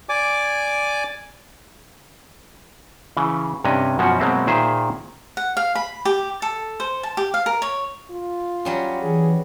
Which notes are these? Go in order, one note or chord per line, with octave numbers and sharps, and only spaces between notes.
D5 G#5 D6
C#3 E3
G2 C3 C#4 D4 D#5
F#2 B2 F3 C#4 F#4 F#5
B2 F#3 G#3 A#3 C4 E5
A#2 D#3 G#4 C5 E5
F#5
F5
B5
G4
A4
C5
A5
G4
F5
A#4
C#5
F4
F#3 G3 C#4
E3 G#4